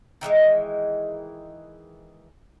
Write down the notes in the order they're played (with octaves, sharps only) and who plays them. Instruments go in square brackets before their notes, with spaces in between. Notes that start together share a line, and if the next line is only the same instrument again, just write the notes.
[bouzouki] D#3 E3 G3 G#3